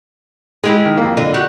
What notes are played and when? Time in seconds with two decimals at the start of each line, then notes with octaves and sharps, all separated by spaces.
0.64 G#3 E4 G4 G#4
0.85 D#3
0.97 F2 A#3
1.17 D3 D#5
1.34 F#4 G4